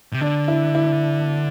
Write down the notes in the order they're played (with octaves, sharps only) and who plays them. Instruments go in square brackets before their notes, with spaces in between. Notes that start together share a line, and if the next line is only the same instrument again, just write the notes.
[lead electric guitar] C3
[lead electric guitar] D3 [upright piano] D4
[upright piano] E4
E4